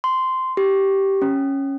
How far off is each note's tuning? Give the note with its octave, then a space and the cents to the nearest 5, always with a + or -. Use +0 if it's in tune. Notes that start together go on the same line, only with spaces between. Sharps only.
C6 -10
G4 -10
C#4 -10